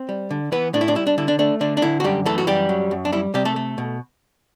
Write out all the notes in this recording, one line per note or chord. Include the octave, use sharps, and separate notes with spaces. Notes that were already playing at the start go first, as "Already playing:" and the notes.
Already playing: C4 C5
G3
D3
E3 B3 B4
A2 D4
E4
D4
G3 E4
D4
D3 E4
D4
A3 D4
D3 D4
D4
D3 E4
F#4
F#2 G3 G4
E3 A3 A4
F#4
F#2 G3 G4
F#3
F#2
D4
G3 E4
C3 G3 G4
A3 A4
A3
B2